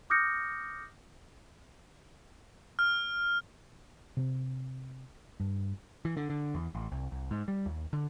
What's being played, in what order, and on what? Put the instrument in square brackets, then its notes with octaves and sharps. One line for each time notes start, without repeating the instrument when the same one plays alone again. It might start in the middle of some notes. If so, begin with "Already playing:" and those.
[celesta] D6 D#6 F6 G6 A#6 C#7
[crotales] F6
[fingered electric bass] C3 C4
G2
[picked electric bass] E3
D3
D3
E2
A1
C2
C2
G#2
G3
D#2
D3